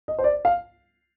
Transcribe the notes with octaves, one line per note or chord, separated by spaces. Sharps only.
D#5
C5
D5
F5